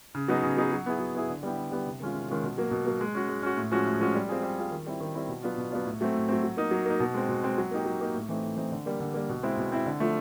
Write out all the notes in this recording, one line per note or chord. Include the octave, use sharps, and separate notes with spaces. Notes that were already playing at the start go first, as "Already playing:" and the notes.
C#3
F#3 B3 D#4 G#4
C#3
F#3 B3 D#4 G#4
F#3
B3 E4 G#4
F#3
B3 E4 G#4
D3
G3 B3 E4 G4
D3
G3 B3 E4 G4
C3
D#3 G#3 C#4 F4
C3
D#3 G#3 C#4 F4
B2
F#3 A#3
B2
F#3 A#3
G#3
C#4 F#4
G#3
C#4 F#4
A2
F3 G#3 C#4 F#4
A2
F3 G#3 C#4 F#4
G3
C4 F4 G#4
G3
C4 F4 G#4
D#3
G3 C4 E4
D#3
G3 C4 E4
B2
F#3 B3 D4 F4
B2
F#3 B3 D4 F4
A2
F#3 A3 C4
A2
F#3 A3 C4
F#3
A#3 D#4
F#3
A#3 D#4
B2
G#3 C4
B2
G#3 C4
F#3
A#3 D#4 G4
F#3
A#3 D#4 G4
A2
E3 A3 C4 D#4
A2
E3 A3 C4 D#4
D3
G3 A#3
D3
G3 A#3
B2
G#3 C4 E4
B2
G#3 C4 E4
D3
F3 A3